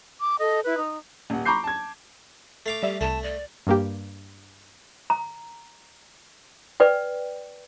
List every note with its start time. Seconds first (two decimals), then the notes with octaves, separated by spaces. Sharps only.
0.22 D6
0.39 A4 D#5
0.65 E4 B4
0.78 D#4
1.30 D#1 F#5
1.45 A#5 B5 C#6 D6 G6 C7
1.64 A5 G#6
2.66 A3 F5 D6
2.83 G3 G4 D5 E5
3.01 C2 A3 A5
3.23 D5
3.67 G2 A#3 G4
5.10 A#5
6.80 B4 D5 G5